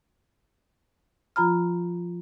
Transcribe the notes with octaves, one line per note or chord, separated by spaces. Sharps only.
F3 F4 A#5 B5 F6